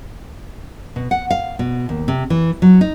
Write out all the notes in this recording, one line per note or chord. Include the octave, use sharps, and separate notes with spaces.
B2
F#5
F5
B2
D#2
C3
E3
F#3
D#4